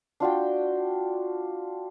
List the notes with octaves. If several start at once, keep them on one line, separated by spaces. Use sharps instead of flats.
D4 F4 F#4 G5